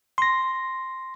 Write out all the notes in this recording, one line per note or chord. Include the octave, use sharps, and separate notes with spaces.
C6 A#6